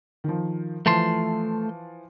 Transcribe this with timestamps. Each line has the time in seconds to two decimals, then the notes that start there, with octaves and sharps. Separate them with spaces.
0.24 D#3 F3
0.86 E3 F3 A3 A5 C6